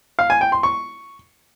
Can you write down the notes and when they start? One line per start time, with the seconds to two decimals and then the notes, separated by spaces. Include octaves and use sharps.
0.19 F5
0.30 G#5
0.41 G5
0.52 C6
0.63 C#6